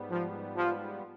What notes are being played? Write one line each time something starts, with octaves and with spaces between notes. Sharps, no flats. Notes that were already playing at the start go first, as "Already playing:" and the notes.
Already playing: G#2 G3 B3
F3
F3